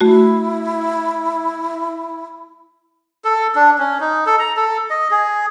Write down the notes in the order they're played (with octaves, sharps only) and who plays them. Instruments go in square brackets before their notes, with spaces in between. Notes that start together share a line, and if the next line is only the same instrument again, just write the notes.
[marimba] A3 F#4 [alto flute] E4
[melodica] A4
D4
C#4
D#4
A4
A#5
A4
D#5
G#4